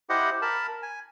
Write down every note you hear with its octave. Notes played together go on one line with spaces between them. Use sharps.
E4 G4 C5 D#5 F#5
A#4 A5 B5
G#5